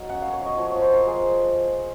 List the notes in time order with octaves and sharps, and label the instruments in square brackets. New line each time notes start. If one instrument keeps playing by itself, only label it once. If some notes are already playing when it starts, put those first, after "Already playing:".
Already playing: [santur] F#3 A#4 D#5
C#4 F#5
A#3 F5
C#5
F#3 D#5
F3 C#5
F3 C#5
C5
C4 A#4
F3 G#4